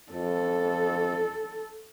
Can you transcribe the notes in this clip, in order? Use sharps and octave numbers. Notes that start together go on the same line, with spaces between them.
F2 A4